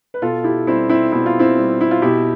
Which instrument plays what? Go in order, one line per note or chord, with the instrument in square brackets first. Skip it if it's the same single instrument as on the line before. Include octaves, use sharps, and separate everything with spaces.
[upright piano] B4
B2 F4 A4
E4 G4
G3 C4 E4
C4 E4
B2 E4
F4
C4 E4
G3
E4
F4
B2 E4 G4